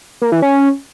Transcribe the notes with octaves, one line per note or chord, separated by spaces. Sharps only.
A#3
E3
C#4